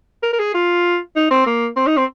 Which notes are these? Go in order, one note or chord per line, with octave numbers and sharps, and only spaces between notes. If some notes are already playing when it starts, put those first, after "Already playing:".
A#4
A#4
G#4
F4
D#4
C4
A#3
C4
D#4
C4